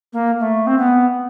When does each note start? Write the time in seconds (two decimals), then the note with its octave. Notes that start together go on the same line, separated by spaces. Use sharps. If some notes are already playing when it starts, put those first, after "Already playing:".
0.13 A#3
0.39 A3
0.67 C4
0.78 B3